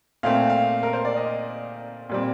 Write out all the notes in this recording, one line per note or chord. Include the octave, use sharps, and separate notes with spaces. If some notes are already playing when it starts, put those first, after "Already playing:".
A#2 A3 C4 F5
F5
A#4
C5
D5
D#5
A#2 G3 C4